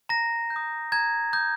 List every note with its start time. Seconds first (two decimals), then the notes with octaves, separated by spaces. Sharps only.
0.09 A#5 A#6
0.50 G6
0.56 D#6
0.92 A#5 G#6
1.33 D#6 G6